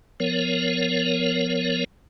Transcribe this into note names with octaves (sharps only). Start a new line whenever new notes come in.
F3 B3 A#4 C#5